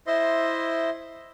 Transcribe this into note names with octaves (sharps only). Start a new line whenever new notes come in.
E4 C5 D#5 E5 C6